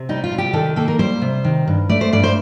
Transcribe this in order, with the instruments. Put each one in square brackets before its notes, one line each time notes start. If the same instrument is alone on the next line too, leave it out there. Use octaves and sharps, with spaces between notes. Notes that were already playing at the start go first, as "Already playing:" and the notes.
Already playing: [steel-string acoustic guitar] C3
G3 D#4
F4
C3
G4
D#3 A4
A#3 A4
A#4
G3 C5
C3
D#3
G2
A3 D5
C5
G2 D5
C5